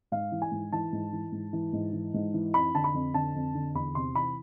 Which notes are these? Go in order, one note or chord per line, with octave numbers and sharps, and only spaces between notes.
G#2 F5
E3
G#5
G#2
E3 A5
G#2
E3
G#2
E3
G#2
E3
G#2
E3
F2 B5
D3 A5
B5
F2
D3 A5
F2
D3
E2 B5
C3 C6
E3 B5